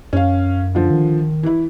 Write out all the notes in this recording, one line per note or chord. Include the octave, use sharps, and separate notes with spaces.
F#2 C#4 F5
D3 F3
D#3
E3 E4